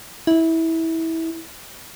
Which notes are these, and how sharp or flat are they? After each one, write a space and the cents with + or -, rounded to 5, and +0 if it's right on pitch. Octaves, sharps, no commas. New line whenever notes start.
E4 -20